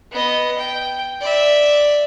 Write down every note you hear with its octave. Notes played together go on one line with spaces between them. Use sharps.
B3 D#5
G5
D5 E5